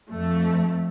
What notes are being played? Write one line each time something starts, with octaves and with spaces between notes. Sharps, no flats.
F2 A3